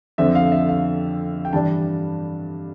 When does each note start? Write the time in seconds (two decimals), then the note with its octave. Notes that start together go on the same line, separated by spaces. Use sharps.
0.18 F2 D3 F3 C4 E5
0.35 F5
0.52 E5
0.69 F5
1.45 G5
1.53 G2 E3 G3 D4 A5